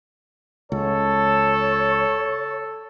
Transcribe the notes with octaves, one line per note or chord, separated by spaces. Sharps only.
C#2 A4 C#5